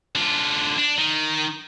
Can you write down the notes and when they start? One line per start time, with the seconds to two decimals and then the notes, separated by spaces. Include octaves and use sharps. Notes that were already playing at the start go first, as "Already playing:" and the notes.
0.15 D3 F4
0.78 D4
0.98 D#3